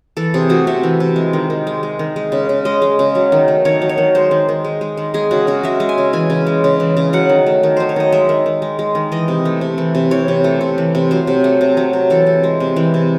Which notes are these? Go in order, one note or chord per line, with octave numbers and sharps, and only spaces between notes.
E3 A4
C3 G#4
A3 F#4
C3 E5
E3
C3
G#3
D#3
D#3
G#3
G#3
D#3
G#3
C#3
C#3
G#3 D#5
G#3
C#3
F#3
D#3
A3
D#3 C#5
F#3
C#5
D#3
G#3 C5
D#3
D#3
G#3
G#3
D#3
G#3 G#4
C#3 F#4
C#3 F#4
G#3 E5
G#3
G#5
C#3
E3 G#5
C#3
G#3
C#3
E3
C#3
F#3 F#5
D#3
A3
D#3
F#3 C5
C#5
D#3 D#5
G#3 E5
D#3
D#3
G#3
G#3
D#3
E3 D#5
C3
A3
C3
E3
C3
E3 C#5
C3
A3
C3
E3
C3
F#3 C5
C3
A3
C3
F#3
C3
E3 A4
C3
G#3
C3
E3
C3